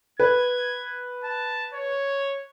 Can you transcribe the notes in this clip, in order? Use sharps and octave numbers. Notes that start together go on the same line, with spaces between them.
B4 G#6
A5
C#5